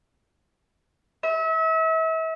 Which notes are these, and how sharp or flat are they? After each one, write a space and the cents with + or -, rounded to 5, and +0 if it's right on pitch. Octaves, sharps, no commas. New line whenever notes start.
E5 -35